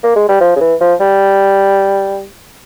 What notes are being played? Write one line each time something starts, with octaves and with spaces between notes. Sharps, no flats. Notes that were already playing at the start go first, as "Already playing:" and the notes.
A#3
G#3
G3
F3
C#3
E3
F3
G3